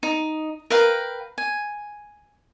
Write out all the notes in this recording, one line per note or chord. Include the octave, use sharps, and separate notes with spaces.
D#4
A#4 B4 F5 G5
G#5